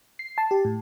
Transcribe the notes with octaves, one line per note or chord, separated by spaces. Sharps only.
C7
A5
G4
A2